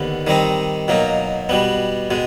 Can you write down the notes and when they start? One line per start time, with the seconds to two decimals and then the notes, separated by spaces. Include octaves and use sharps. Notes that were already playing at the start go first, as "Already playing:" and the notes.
Already playing: D#2 D3 B3
0.27 D#3 G3 C4 D#4
0.88 B2 F#3 A#3 D#4
1.49 B2 G3 B3
2.11 B2 G#3